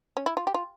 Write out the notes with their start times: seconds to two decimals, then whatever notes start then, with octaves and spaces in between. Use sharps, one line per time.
0.17 C#4
0.26 E4
0.37 F4
0.47 G4
0.54 F4